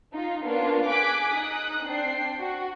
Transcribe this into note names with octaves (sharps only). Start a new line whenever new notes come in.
D#4 F4
A#3 B3 C#4 D4 F4
G#4 G#5 D6 F#6 B6 D7
D#4 D#6 F#6
C4 D4 G5 C7
F#4